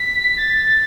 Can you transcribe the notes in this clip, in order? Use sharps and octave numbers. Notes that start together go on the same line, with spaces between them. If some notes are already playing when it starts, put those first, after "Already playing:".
Already playing: B6
A6